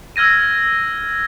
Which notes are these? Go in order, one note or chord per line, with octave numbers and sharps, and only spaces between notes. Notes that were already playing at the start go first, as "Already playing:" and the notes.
E6 F6 G#6 A#6 D#7